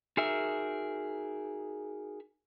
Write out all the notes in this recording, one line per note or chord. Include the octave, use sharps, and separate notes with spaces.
D#4 F#4 G#4 A#4 E5